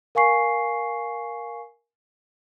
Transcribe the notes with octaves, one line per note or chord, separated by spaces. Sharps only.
A#4 F5 G#5 C#6 C7